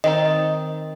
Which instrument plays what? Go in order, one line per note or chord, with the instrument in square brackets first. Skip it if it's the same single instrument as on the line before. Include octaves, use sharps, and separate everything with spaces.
[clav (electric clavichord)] D#3 C4 D#4 [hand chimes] D#5